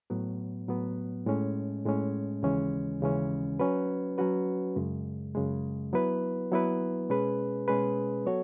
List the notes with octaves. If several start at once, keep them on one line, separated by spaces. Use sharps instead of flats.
A2 F#3 B3
A2 F#3 B3
A2 G#3 C#4
A2 G#3 C#4
D#2 C#3 E3 G#3 C#4
D#2 C#3 E3 G#3 C#4
F#3 C#4 F#4 B4
F#3 C#4 F#4 B4
F#2 C#3 G#3
F#2 C#3 G#3
F#3 B3 E4 B4
F#3 B3 E4 B4
B2 G#3 C#4 G#4 B4
B2 G#3 C#4 G#4 B4
F#3 B3 F#4 A4 C#5